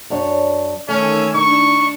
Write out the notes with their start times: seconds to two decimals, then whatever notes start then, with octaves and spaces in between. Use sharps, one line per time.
0.10 F#2 D4 C#5
0.89 D#3 A3 C#4 G#5 E6
1.34 D4 D#4 C#6